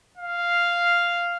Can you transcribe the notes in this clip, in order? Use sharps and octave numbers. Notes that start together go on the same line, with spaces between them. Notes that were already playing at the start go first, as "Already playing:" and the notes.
F5